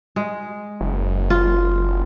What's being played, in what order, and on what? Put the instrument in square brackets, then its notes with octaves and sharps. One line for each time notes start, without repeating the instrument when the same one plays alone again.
[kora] G#3
[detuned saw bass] F#1
[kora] F4